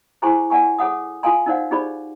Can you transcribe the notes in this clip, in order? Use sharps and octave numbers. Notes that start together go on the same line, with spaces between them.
E4 G#4 C5 G#5 C6 C#6
D5 F#5 G#5 C#6
G#4 A4 C#5 F#5 D#6
F4 A4 F5 G#5 C6
D#4 A#4 C5 D5 F5 F#5
D#4 G4 G#4 C5 D5 B5